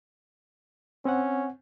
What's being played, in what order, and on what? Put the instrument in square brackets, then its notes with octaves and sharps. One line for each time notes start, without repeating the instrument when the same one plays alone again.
[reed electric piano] C4 F#5 [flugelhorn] C#4